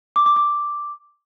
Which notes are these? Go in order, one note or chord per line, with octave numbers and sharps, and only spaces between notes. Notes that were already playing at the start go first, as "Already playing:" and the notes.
D6
D6
D6